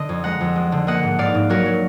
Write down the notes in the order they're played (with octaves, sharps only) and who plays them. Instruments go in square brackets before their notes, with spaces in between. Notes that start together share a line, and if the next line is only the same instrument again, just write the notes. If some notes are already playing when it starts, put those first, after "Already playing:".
Already playing: [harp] D3 D#5
F2
G#3 F#5 A#5
F2
G#3
D3
A#3 D#5 F#5
G#2
G#2 D5 F5
G#2
F#3 F#4 A#4
F#3